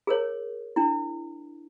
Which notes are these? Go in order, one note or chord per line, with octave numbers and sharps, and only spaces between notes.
G#4 A#4 C#5
D4 E4